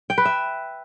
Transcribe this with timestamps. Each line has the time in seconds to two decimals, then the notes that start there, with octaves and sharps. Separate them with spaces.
0.10 G5
0.18 B4
0.25 E5